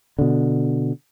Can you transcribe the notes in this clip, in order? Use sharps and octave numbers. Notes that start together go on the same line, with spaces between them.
B2 D3